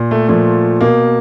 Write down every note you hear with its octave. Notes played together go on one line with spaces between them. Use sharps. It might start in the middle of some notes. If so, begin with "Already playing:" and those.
Already playing: A#2
A3
A#2 F3 A3
B2 A#3